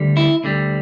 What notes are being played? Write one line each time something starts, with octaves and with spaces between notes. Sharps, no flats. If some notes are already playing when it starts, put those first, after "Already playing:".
Already playing: D2 D3 G3
E4
D2 D3 G3